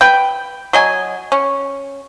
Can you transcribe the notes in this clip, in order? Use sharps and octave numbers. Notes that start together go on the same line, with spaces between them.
B4 G5
F#3 D#5 G#5
C#4